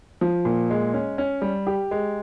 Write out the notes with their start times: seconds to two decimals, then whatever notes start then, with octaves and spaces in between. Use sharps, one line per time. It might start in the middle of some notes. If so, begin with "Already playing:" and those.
0.21 F3
0.45 A#2
0.70 G#3
0.94 C#4
1.18 C#4
1.42 G3
1.67 G4
1.91 G#3